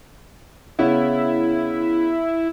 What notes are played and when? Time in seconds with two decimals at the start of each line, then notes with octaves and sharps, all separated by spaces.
0.79 C#3 B3 C#4 E4